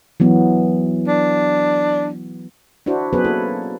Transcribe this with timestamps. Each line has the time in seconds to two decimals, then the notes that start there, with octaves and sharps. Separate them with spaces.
0.20 E3 F#3 B3
1.08 D4
2.86 D4 E4 F#4 C5
3.13 F#3 B3 C#4 G#4 B4 C5
3.24 A#3 E4 A4